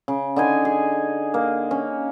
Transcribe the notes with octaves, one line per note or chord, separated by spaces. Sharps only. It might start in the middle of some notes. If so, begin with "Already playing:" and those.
C#3
D3 D#4 G#5
G#4
A#3
C#4